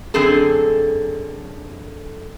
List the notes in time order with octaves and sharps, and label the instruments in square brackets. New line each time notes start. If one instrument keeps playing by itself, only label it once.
[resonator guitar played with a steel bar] F#2 D3 C4 G#4 A4